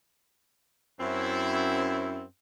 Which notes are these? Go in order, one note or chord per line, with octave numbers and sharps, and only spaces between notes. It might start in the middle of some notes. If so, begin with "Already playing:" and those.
F#2 C4 E4